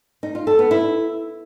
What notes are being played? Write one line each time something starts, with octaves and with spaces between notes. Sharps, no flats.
D#4
F4
A4
B3
E4